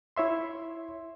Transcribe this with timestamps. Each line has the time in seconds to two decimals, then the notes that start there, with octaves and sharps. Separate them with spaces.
0.17 E4 C#5 E5 C6